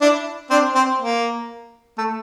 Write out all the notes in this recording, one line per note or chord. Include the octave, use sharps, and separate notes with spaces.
D4 E4
C4 D4
C4
A#3
A3